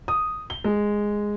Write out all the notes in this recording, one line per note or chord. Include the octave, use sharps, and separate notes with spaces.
D#6
G7
G#3